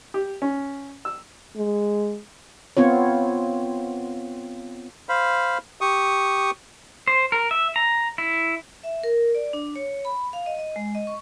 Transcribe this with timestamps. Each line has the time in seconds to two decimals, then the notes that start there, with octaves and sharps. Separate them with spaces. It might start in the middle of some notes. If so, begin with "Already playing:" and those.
0.14 G4
0.42 C#4
1.05 E6
1.56 G#3
2.77 B3 C4 F4 C#5
5.09 C5 F5 B5
5.81 G4 C#6 D#6
7.08 C5
7.32 A#4
7.51 E5
7.76 A#5
8.18 E4
8.83 E5
9.03 A#4
9.35 D5
9.53 D4
9.76 C#5
10.05 B5
10.33 F5
10.46 D#5
10.59 D#5
10.76 G#3
10.95 D#5
11.07 C#6